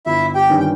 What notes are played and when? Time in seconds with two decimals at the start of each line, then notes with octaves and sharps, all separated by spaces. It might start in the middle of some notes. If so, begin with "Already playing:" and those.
0.06 G1 E4 E5
0.35 G4 G5
0.50 G2 D#3 G3 C#4
0.60 G5